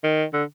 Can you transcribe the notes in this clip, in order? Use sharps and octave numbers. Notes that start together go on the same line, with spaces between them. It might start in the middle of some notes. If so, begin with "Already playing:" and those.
D#3
D3